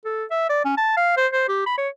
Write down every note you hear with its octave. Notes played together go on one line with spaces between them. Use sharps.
A4
E5
D5
C#4
A5
F5
C5
C5
G4
B5
C#5